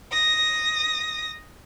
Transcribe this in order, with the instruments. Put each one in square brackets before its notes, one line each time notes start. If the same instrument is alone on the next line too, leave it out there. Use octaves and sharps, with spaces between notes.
[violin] D#6 A#6